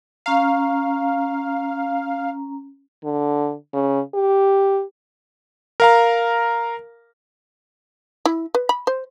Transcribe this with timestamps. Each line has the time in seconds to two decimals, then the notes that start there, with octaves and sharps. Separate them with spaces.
0.26 C#4 F5 A#5
3.04 D3
3.74 C#3
4.14 G4
5.80 A#4 F5 A#5
8.26 E4
8.55 B4
8.69 B5
8.87 C5